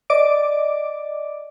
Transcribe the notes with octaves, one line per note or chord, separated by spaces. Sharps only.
D5 D#5 D6 D7